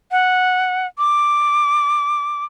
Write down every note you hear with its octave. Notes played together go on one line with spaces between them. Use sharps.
F#5
D6